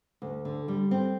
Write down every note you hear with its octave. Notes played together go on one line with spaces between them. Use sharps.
D2
D3
G3
C4